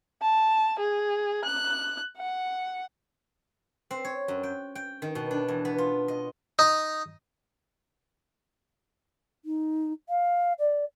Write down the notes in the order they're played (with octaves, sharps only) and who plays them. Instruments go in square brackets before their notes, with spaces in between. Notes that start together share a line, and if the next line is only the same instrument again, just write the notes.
[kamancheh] A5
G#4
F#6
F#5
[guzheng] C4
C#5
F#2
G5
G5
D#3
B2
D4
E2
B3
F4
D#5
[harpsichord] D#4
[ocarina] D#4
F5
D5